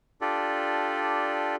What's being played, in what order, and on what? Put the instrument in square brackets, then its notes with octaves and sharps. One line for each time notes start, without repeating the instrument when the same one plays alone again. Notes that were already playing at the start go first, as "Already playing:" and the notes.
[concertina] D4 F4 G4 A4 D5